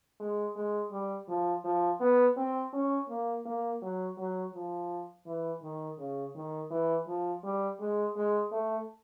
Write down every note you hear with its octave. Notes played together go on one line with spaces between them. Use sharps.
G#3
G#3
G3
F3
F3
B3
C4
C#4
A#3
A#3
F#3
F#3
F3
E3
D#3
C#3
D#3
E3
F3
G3
G#3
G#3
A3